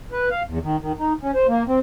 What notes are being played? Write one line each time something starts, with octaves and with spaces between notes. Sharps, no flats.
B4
F5
E2
D#3
D#3
D#4
C#4
C5
A#3
C4